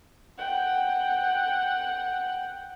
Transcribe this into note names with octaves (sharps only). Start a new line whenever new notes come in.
F#5 G5